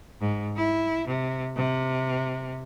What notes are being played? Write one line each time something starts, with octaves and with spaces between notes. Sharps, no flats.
G#2
E4
C3
C3